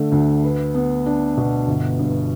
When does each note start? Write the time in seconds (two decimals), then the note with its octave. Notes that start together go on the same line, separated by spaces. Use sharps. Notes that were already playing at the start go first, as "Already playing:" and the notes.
Already playing: D3 A3 D4
0.12 D2
0.44 B4
0.74 B3
1.06 D4
1.37 B2
1.67 G1
1.99 G2